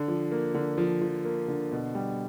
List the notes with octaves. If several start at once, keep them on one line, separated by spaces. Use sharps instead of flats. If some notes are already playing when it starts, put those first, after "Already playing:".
Already playing: D3
F3
A#3
D3
F3
F3
A#3
D3
B2
G3